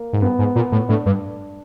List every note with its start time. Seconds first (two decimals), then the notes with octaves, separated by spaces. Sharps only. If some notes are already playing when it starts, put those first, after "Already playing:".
Already playing: A#3
0.13 G#2
0.22 G2 B3
0.39 G#2
0.56 A#2
0.72 A2
0.89 A2 D4
1.06 G2